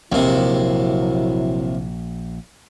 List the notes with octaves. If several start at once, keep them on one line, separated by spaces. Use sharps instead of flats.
A#1 D#2 C3 F#3 E4